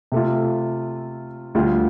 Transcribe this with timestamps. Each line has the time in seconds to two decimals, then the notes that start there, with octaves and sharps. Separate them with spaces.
0.12 C3 A3 F4
1.55 D2 D3 G3 F4